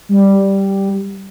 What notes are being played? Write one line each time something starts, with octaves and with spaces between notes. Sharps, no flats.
G3